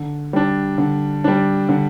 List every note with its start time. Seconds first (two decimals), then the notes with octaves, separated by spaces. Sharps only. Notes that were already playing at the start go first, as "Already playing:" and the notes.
Already playing: D3
0.33 G3 D4
0.78 D3
1.24 G3 D4
1.69 D3